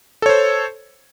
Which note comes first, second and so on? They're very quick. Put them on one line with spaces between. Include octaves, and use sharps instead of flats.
A4 C#5 C5